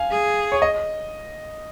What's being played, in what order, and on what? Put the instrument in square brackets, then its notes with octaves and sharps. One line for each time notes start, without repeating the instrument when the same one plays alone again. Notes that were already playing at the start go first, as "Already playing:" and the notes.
Already playing: [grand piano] F5 G#5
[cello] G#4
[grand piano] C#5
D#5